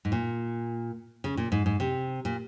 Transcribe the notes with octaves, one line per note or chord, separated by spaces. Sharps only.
G#2
A#2
C#3
A#2
G#2
G#2
C3
A#2